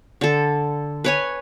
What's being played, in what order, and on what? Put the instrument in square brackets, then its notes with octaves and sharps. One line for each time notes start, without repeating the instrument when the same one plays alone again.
[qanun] D3 A4
B4 C#5 G#5